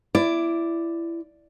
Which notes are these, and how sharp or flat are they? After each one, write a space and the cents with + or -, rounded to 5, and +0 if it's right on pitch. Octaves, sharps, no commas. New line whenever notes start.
E4 +20 D5 +0